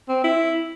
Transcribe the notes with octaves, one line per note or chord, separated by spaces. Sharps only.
C4
E4